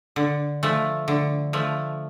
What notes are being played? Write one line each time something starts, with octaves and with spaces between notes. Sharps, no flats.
D3
F3 A3
D3
F3 A3